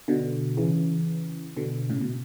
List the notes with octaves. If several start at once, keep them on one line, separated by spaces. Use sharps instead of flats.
B2 D3
C#3 E3
B2 D3
A2 C#3
B2